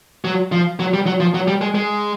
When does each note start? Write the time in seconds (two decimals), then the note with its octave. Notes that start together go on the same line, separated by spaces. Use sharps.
0.25 F#3
0.52 F3
0.80 F#3
0.93 G3
1.06 F#3
1.20 F3
1.34 F#3
1.48 G3
1.61 G#3
1.75 G#3